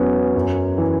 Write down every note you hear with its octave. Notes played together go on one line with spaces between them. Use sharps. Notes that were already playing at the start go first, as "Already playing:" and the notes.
Already playing: E2 F#3 B3 C#4
F#2
E3